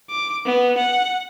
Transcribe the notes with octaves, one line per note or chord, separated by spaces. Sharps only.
D6
B3
F#5